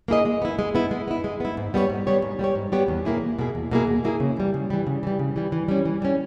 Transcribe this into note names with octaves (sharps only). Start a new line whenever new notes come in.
A#3 E4 G#4 D#5
G#3
B3 E4
G#3
B3 E4
G#3
B3 E4
G#3
B3 E4
G#2
G3 B3 G4 C#5
G#2
G3 B3 G4 C#5
G#2
G3 B3 G4 C#5
G#2
G3 B3 G4 C#5
E2
B2 A#3 E4 G#4
E2
B2 A#3 E4 G#4
E2
B2 A#3 E4 G#4
E2
B2 A#3 E4 G#4
C#3
E3 G3
C#3
E3 G3
C#3
E3 G3
C#3
E3 G3
E3
G3 C#4
E3
G3 C#4